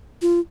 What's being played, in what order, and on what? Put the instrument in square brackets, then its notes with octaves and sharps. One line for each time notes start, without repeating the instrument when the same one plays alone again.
[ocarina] F4